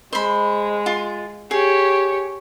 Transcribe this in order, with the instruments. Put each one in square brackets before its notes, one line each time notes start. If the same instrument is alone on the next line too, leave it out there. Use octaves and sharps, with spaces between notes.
[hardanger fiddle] G#3 [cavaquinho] C5 B5
[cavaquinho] F4
[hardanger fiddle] G4 C#5 [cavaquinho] G#4